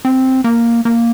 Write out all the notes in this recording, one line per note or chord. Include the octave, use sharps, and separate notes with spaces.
C4
A#3
A#3